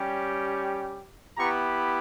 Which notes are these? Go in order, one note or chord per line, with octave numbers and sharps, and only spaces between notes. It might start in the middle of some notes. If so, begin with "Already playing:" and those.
Already playing: G3 C#4 G4
B3 E4 G4 A#5 C#6